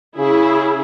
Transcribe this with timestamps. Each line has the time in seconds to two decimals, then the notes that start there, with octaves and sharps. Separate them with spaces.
0.18 C#3 E4 G#4